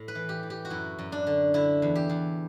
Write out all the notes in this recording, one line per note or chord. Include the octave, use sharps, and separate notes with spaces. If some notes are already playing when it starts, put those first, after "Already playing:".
Already playing: A2
B4
E3
G4
E3
G4
F#4
F#2 E4
F#2
D4
D3
D3 E4
E2
G4
E2